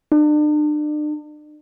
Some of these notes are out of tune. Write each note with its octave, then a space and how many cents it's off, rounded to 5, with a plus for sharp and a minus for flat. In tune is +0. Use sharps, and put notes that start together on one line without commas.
D4 +40